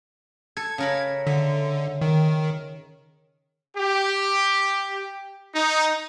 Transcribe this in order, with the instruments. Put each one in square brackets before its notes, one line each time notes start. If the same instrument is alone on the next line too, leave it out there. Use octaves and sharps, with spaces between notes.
[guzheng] A4 [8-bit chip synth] G#6
[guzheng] C#3 A#4 B5
[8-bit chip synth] D3 [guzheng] E5
[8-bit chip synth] D#3
[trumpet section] G4
D#4